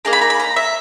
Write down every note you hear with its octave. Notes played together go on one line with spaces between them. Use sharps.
A#3 D#4 G#4 A#5
B5
A#5
B5
A#5
E5